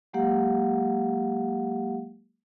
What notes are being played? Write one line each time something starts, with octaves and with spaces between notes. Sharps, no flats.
F#3 G#3 A#3 G4 F5 F#5